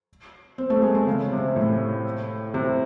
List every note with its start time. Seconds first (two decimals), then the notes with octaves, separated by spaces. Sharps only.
0.58 C4
0.70 A3
0.82 G#3
0.94 G#3
1.07 C#3
1.32 C3
1.56 A2
2.54 C3